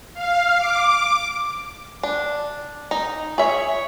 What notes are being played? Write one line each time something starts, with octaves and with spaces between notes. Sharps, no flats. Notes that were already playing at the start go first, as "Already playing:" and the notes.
F5
D6
D4
D#4
G#4 C#5 E5